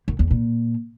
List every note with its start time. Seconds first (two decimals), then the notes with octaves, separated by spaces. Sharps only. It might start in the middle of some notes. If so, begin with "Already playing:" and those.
0.08 F#2
0.19 E2
0.31 A#2